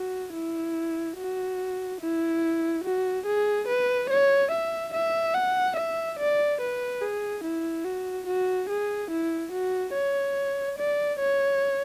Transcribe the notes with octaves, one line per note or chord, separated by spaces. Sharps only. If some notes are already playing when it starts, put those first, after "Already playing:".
Already playing: F#4
E4
F#4
E4
F#4
G#4
B4
C#5
E5
E5
F#5
E5
D5
B4
G#4
E4
F#4
F#4
G#4
E4
F#4
C#5
D5
C#5